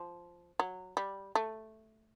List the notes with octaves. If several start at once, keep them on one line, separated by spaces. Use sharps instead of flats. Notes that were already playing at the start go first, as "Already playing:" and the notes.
Already playing: F3
F#3
G3
A3